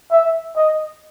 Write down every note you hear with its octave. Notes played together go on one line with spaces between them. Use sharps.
E5
D#5